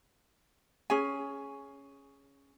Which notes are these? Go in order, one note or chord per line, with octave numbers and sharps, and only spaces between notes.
C#4 G#4 G#5